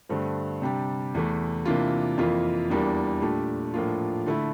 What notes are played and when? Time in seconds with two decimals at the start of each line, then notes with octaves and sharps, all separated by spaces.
0.09 G2 D3 A3 C4
0.62 C3 G3 D4 G4
1.14 E2 E3 A3
1.65 C3 E3 A#3 D4 F4
2.17 F2 E3 A#3 F4
2.70 E2 E3 G3 A#3 D4
3.22 A#2 A3 D4 G4
3.74 A2 F3 A#3 D4 F4
4.26 D3 A3 E4